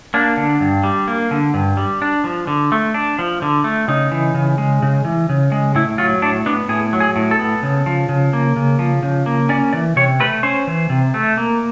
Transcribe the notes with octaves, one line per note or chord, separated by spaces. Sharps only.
A#3 D4
D3
G2
G3
A#3
D3
G2
G3
D4
F3
D3
A3
D4
F3
D3
A3
C#3 D#4
E3
C#3
G#3
C#3
E3
C#3
G#3
A2 E4
F#3 F4
A2 D4
B3 D4
A2 G#4
F#3
G#4
A2
A4
B3
C#3
F3
C#3
A#3
C#3
F3
C#3
A#3
C#4 D5
E3 D5
C3 C#5
A3 B4
C#4 C5
E3
C3
A3
A#3